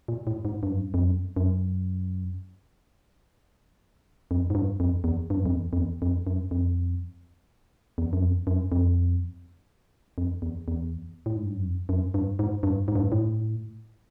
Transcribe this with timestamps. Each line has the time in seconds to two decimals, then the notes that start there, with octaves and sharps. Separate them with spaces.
0.08 A#2
0.27 A2
0.45 G#2
0.63 G2
0.71 F#2
0.79 G2
0.94 F2
1.00 F#2
1.36 F#2
4.31 F2
4.50 G#2
4.55 G2
4.80 F2
5.04 E2
5.30 G2
5.37 F#2
5.46 F2
5.53 E2
5.73 F2
5.78 E2
6.02 F2
6.27 F#2
6.51 F2
7.98 E2
8.13 F#2
8.22 F2
8.47 F#2
8.72 F2
10.18 F2
10.42 E2
10.68 E2
11.26 A2
11.37 G#2
11.45 G2
11.55 F#2
11.66 F2
11.89 F#2
12.14 G2
12.39 G#2
12.63 G2
12.88 G#2
12.95 G2
13.02 G#2
13.12 A2